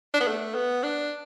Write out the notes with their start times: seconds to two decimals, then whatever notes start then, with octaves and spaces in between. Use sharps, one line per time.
0.14 D4
0.21 B3
0.28 A3
0.55 B3
0.83 D4